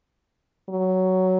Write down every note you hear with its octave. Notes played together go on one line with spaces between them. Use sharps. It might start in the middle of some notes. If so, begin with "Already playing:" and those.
F#3